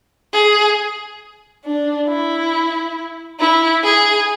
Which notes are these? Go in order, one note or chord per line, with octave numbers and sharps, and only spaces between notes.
G#4
D4
E4
E4
G#4